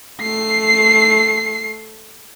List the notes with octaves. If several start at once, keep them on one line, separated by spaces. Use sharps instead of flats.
A3 C7